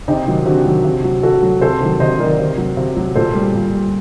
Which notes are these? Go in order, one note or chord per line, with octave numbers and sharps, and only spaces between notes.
C3 D#4 G4
D#3 F#3
C3 D4 F#4
D#3 F#3
C3
F#3
C3 F#4 A4
F#3
C3 A4 C5
D#3 F#3
C3 C5 D#5
D#3 F#3 A#4 D5
C3
F#3
C3
F#3
A#2 A4 C5
G3
A#2
G3